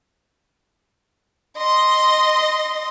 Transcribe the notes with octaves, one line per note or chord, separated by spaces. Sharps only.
D#5 C6